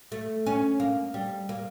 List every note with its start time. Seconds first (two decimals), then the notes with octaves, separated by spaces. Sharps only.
0.12 A3
0.46 C#4
0.80 A#3
1.14 G3
1.49 A#3